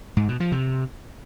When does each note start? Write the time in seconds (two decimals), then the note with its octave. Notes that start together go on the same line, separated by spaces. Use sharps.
0.17 G#2
0.28 B2
0.40 F3
0.52 C3